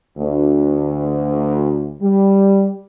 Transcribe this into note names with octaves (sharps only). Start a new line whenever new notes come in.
D2
G3